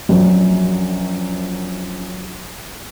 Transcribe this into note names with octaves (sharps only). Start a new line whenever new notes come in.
A#1 F#2 F#3